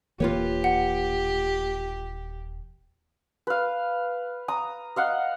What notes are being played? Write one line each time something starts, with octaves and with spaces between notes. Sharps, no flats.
D#1 E3 A#3 F4 G4 B4 C#5
F#5
B4 F5
A#5 D#6
D#5 F5 F#5